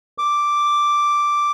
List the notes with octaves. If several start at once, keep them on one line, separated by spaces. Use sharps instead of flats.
D6